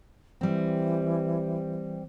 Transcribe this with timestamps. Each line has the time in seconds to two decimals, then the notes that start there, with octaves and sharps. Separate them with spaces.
0.41 E3 G3 C4